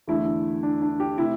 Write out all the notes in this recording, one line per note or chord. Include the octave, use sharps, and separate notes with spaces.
E2 D3 A3 E4
D4
D4
G4
C3 A3 E4